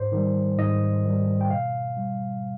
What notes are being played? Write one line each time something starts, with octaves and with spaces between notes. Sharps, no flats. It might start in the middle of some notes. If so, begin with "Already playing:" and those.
Already playing: G#2 C5
D#3 G3
G#2 D#5
D#3 G3
G5
B2 F5
G3